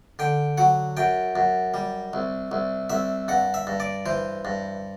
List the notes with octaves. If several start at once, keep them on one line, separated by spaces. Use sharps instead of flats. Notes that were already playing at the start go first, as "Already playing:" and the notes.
D3 G5
F#3 F#5
F#2 G5
F#2
G3
C2
C2
C2 E5
G2 F#5
E5
G2
D5
E3 C5
G2